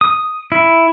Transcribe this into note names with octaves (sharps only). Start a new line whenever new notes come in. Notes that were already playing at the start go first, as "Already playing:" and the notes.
D#6
E4